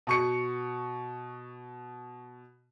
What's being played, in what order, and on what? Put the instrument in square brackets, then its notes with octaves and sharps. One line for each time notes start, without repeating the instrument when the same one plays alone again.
[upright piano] B2 C#6 C#7